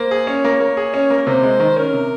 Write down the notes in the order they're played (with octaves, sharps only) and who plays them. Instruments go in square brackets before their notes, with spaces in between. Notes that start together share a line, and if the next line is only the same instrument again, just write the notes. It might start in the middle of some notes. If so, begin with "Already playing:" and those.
Already playing: [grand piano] A#3 [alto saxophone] C5
[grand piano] G#4
[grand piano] C#4 [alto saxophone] C#5
[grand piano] A#3
A#3
G#4
C#4
A#3
[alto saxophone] A#4
[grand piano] C3 [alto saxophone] C5
[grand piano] G#3
D#3
[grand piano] C#4 [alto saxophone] A#4
[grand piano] C3